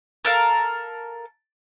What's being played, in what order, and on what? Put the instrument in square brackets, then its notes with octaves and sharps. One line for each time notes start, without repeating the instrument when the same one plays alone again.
[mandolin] A4 A#4 F5